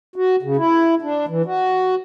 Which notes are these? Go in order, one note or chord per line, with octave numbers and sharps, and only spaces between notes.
F#4
C#3
E4
D4
E3
F#4